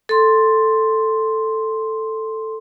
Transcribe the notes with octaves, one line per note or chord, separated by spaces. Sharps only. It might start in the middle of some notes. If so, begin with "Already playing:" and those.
A4 C6